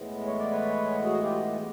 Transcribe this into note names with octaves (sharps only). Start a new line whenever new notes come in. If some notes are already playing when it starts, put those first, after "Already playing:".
Already playing: A2 E3 G#3 B3
C#5
D5
B4 C#5
F#4 G#4
F4 G4